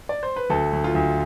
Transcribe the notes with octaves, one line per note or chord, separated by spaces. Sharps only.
D5
C5
B4
D2 A4
D2
F4
D2